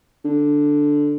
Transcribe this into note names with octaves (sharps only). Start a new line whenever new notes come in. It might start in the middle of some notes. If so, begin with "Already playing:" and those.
D3